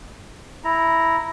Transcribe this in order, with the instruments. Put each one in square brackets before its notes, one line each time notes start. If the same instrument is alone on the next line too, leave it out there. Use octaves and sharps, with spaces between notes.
[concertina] E4 A#5